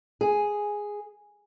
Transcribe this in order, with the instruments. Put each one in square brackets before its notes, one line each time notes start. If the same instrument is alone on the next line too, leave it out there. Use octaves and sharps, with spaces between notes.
[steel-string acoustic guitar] G#4